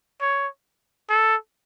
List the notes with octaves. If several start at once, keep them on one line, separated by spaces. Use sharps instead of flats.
C#5
A4